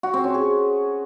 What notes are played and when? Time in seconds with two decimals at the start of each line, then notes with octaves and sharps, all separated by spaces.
0.03 F#4
0.14 C4
0.24 C#4
0.34 G#4